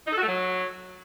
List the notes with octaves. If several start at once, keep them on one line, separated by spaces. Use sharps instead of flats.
D#4
A4
F#4
A3
F#3